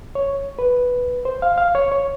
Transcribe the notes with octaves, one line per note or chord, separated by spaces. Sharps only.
C#5
B4
C5
F5
F5
C#5
C#5